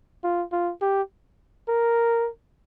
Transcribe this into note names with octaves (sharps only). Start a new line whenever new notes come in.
F4
F4
G4
A#4